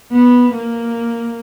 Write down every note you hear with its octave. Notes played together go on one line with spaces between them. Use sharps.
B3
A#3